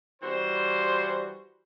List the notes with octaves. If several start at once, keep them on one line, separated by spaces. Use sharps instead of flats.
E3 G3 F#4 C5